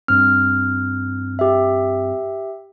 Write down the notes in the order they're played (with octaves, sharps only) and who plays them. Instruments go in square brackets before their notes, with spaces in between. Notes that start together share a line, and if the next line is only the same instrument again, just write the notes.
[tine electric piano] G2 C4 [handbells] F6
[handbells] G4 E5